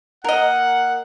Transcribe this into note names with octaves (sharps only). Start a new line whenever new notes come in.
A#3 A#4 D#5 F#5